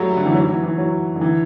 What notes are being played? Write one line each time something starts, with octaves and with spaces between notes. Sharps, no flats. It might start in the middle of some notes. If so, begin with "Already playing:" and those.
Already playing: F#3 G3 A3
D3
E3
F#3
E3
E3
F#3
D3
E3